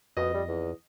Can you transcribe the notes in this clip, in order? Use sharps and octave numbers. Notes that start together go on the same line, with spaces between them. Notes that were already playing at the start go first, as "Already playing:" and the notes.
F2 B2 D#5
G3
E2